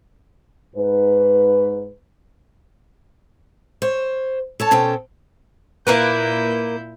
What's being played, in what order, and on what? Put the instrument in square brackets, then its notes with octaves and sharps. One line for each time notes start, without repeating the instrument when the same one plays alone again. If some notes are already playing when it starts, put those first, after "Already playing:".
[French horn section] G#2 B4
[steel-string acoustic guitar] C5 C#5
A4 C#5 A5
B2 C#4 A4 C5 G5
[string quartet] A#2 E4 G6 [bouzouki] A#3 A#4 B4